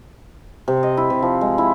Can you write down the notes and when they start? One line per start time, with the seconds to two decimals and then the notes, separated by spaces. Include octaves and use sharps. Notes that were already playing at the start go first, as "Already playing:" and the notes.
0.68 C3
0.83 D#5
0.97 E4
1.10 C3
1.22 F3
1.41 G#3
1.58 E4